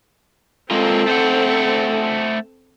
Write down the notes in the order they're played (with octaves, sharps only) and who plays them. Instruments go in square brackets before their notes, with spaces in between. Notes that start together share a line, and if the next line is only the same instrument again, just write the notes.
[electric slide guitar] G#3 A#3 F4 [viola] C4 A4
[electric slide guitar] A3 C5 F#5